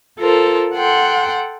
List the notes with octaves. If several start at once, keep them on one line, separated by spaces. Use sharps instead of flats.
F4 A4 A#4 C5
A4 F#5 G5 C6